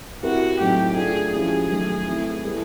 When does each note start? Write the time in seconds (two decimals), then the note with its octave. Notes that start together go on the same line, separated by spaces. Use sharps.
0.23 C4 E4 F#4 G4 A#4
0.60 A2 F#3 A3 C4 D#4 G4
0.96 A3 D4 F4 G#4 A4
1.33 F3 G#3 C#4 E4 G4 G#4
1.70 D#3 F#3 A3
2.06 E3 A3 C4 E4 A4
2.43 G3 B3 E4 A4